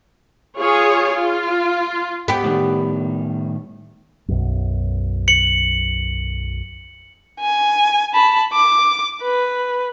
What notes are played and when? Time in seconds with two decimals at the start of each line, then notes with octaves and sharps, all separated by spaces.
0.57 F4 G#4 C#5
1.13 F4
2.28 B3 G4
2.44 A2 D#3 G3
4.28 B1 F#2
5.28 C#7 F#7
7.40 G#5
8.14 A5 B5
8.53 D6
9.23 B4